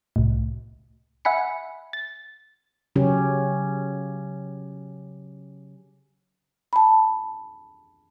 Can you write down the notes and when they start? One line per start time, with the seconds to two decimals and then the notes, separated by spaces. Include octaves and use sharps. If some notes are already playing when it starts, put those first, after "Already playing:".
0.16 C2 A2
1.25 E5 F#5 G#5 B5 C#7
1.93 A6
2.96 C#3 F#3 C#4 G4
6.73 A5 B5